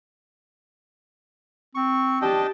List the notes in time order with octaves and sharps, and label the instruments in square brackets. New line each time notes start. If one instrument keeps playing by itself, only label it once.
[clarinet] C4 [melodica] C#6
[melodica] D4 D#5 G5 [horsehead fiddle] G4 A5